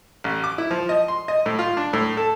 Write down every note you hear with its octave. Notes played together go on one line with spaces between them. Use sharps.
A1
D6
E4
F3
D#5
C6
D#5
A2
F4
D4
A2
A4